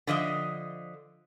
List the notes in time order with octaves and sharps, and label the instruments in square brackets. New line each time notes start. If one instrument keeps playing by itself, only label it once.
[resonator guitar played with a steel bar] D3 F3 D#5 E5